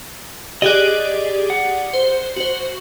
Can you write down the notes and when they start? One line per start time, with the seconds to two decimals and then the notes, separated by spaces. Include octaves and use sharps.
0.62 G4 G#4 D5 D#5 F#6
1.50 F#5
1.93 C5
2.36 F#4 C5